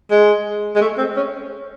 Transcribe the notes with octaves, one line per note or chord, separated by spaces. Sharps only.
G#3
G#3
A3
C4
C#4